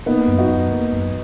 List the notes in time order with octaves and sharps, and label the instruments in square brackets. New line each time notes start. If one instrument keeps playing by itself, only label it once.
[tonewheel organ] A#3 [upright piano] B3 D#4
[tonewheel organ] F#2
[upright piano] D#4 F#4
[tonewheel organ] F#2
A#3
F#2